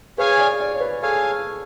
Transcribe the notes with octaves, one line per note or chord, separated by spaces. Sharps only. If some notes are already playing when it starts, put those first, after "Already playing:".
G#4 B4 C#5 F5 G#5
D5
D5
C#5
B4
G#4 A4 C#5 F5 G#5